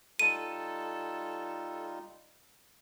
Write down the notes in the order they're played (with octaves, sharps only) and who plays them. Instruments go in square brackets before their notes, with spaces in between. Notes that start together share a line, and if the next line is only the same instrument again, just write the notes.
[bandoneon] G3 D#4 F4 [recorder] A4 [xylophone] D#7